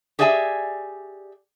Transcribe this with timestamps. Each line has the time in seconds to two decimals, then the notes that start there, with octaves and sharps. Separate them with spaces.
0.19 G4 G#4 D5 E5 F#5 G#5